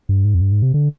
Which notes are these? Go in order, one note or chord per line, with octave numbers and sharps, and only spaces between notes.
G2
G#2
F2
G2
G#2
C3
D3